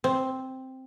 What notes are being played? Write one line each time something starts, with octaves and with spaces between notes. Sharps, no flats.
C4